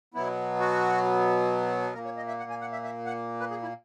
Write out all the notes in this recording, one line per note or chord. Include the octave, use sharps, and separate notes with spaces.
B2 F#3 B3 E4
F#4
A#2 A#3 A#4
C#5
D#5
E5
F#5
G#5
F#5
E5
E5
F#5
B4
G#4
E4